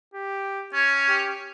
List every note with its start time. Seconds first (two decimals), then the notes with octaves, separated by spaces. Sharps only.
0.14 G4
0.74 C#4 G#6
1.09 G4